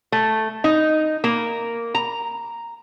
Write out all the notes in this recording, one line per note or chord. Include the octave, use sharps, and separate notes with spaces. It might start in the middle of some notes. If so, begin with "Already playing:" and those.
A3
D#4
A#3
A#5